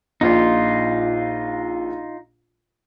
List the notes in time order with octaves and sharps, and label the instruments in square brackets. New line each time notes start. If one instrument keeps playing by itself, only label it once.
[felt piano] A#1 A#2 [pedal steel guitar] D#4 F4